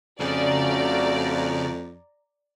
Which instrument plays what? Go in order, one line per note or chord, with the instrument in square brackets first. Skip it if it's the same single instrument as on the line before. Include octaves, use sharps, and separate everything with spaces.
[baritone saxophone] F2 [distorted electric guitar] C#3 G#4 [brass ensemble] A3 F4 F#4 [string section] D5 A#5